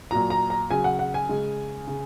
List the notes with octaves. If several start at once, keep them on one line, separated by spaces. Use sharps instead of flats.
A#2 F#3 A#5
A#5
A#5
C#3 F#3 G#5
F#5
F#5
G#5
C#3 G#3
C#3